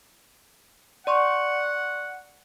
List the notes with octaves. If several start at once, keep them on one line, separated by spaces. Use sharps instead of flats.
D5 F#5 C6 C#6